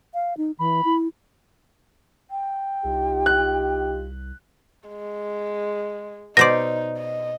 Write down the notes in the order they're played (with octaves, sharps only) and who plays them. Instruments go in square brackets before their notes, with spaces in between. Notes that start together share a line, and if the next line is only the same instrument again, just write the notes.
[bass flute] F5
D#4
[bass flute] E3 [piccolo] B5
[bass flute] E4
[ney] G5
[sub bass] C2 [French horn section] D#4 F4 G4
[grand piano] F#6
[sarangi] G#3
[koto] B2 C5 D5 [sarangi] D#4 [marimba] A#6
[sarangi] D#5